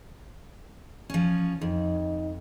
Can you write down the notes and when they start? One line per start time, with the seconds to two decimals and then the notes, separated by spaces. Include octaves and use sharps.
1.10 F3 C#4
1.61 F2 D#4